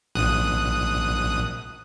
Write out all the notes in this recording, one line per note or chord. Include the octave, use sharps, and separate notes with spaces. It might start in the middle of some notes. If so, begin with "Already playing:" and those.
A#1 D#6 F#6